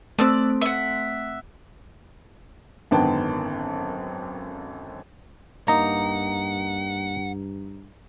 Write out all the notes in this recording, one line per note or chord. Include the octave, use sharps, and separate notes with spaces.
A3 C4 D5 E6
E5 F#5
G#1 F#2 D3 B3 G5 A5
G2 A#3 D#4 F#5 A#5